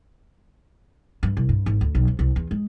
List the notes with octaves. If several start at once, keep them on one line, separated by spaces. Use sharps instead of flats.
G2
C2
G2
G#1
D2
B1
F2
C2
E2
G#3